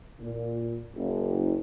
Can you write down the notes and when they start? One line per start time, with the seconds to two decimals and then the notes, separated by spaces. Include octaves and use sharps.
0.22 A#2
0.96 F#1